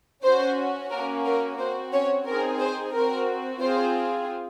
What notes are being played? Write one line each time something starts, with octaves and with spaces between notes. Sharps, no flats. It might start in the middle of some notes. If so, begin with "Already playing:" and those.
C#4 F#4 C5
A#3 C#4 F#4 A#4
A#4
C4 F#4 C5
C#4 C#5
C4 D#4 G#4 A#4
C5
C4 F#4 A#4
C4 F4 G#4 C5